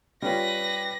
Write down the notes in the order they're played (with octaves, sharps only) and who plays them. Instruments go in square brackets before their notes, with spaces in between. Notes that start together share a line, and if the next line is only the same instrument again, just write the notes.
[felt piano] G3 C#4 F4 [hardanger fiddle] B4 [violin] A#6